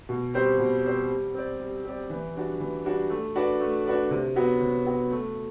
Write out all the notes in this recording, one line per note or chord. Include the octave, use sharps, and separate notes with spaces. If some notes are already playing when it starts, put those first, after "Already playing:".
B2
G3 C4 G4 C5
B2
G3 C4 G4 C5
G3
C4 G4 D5
G3
C4 G4 D5
E3
G3 D4 F#4
E3
G3 D4 F#4
A3
D4 F#4 B4 D5
A3
D4 F#4 B4 D5
C3
F#3 B3 F#4
C3
F#3 B3 F#4
A3